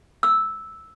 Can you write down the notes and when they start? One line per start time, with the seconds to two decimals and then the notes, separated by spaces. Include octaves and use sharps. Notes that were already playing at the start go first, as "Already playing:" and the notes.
0.23 E6